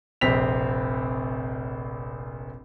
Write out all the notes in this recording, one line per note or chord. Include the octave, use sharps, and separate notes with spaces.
F1 A#1 C4 B6 F7